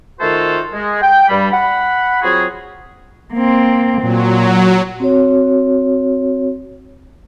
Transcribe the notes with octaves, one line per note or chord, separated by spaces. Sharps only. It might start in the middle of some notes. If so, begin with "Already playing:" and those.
D#3 A3 F4 F#4 A4 C5
G#3
G5
G2 G3 B5
F#5 B5
F#3 C4 F4 F#4 G#4
A#3 C4
A#2 F#3
C4 F#4 C#5